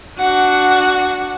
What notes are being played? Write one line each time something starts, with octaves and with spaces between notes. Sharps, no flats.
D4 F#4 F#5